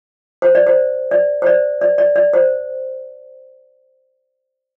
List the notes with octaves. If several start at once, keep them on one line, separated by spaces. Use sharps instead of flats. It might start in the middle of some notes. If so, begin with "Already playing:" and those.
C5
D5
C5
D5
C5
D5
D5
D5
D5
C5